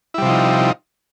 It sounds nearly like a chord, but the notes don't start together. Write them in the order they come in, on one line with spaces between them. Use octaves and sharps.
E4 G3 C3 F3 D#4